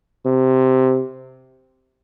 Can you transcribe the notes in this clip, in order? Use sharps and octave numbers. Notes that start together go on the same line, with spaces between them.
C3